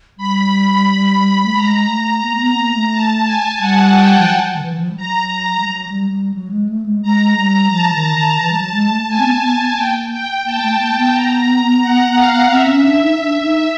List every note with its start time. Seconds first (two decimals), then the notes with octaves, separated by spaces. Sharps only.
0.18 G3 B5
1.45 A3
1.55 G#3 A#5
1.89 A3
2.23 A#3
2.35 A#3
2.41 B3
2.58 A#3
2.75 A3
2.92 A5
3.25 G#5
3.60 G3 F#5
3.94 G5
4.19 F3
4.28 F#3
4.45 F#3
4.56 D#3
4.63 E3
4.73 E3
4.80 F3
4.91 G3
4.97 F#3 A#5
5.60 G3
5.66 F#3
5.89 G3
6.11 G3
6.34 F#3
6.51 G#3
6.69 A3
6.86 G#3
7.02 G#3 A#5
7.37 G3 A#5
7.71 F3 A5
7.94 D#3
8.16 D#3
8.40 E3 A5
8.51 G3
8.57 F#3
8.74 G#3
8.90 A3
9.08 A3 G#5
9.20 C4
9.26 B3
9.42 B3
9.60 B3
9.76 A#3 G5
10.11 G5
10.45 A#3 A5
10.62 A3
10.79 A#3
10.97 B3
11.14 A#5
11.82 F#5
12.16 F5
12.51 C4 E5
12.68 C#4
12.84 D4
13.02 D#4
13.20 D4
13.42 D#4